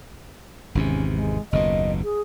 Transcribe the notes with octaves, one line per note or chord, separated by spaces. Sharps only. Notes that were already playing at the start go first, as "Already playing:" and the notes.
G#1 E2 C3 C#4
G#3
F#1 D#2 B2 D#5
G#4